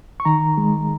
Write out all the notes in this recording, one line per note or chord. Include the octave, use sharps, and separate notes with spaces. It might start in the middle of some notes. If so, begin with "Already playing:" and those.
C#6
D#3 A#5
G#3